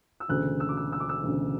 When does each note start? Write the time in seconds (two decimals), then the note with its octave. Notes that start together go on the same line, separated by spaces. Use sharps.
0.20 E6
0.28 E1 D2 C#3 F#6
0.60 E6
0.69 D6
0.77 E6
0.92 E6
1.00 D6
1.09 E6
1.23 E1 D2 C#3